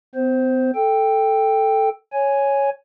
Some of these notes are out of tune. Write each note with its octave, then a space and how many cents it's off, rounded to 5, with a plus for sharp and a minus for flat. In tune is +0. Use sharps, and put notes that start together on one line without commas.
C4 -45 C5 +0
A4 +0 G5 +5
C#5 +0 G#5 +0